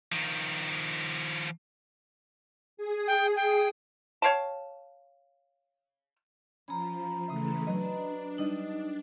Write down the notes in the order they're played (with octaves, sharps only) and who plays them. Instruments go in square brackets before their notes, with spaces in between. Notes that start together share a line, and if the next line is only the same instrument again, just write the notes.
[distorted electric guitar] D#3 F3
[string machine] G#4
[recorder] G5
G5
[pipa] C#5 F5 G5 A5
[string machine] F3 [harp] C#4 [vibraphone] A#5 B5
[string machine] C#3 E3 A3 [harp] E5 C6 D#6
[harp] F#3 B4 D#5 [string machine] D4
[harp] G3 D#5 [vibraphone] D#4